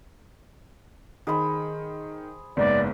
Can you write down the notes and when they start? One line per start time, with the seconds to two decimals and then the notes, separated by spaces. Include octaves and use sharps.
1.27 D#3 G#4 C5 B5
2.57 F#1 G#2 B3 D5